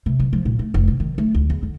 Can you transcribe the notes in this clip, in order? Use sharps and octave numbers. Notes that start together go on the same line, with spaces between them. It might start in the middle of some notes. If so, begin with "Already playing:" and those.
C3
G2
F3
A#2
A3
F1
C3
D#3
A3
D2
E2
D3